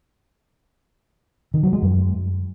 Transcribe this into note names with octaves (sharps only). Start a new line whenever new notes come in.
D#3
F#3
G#3
F#2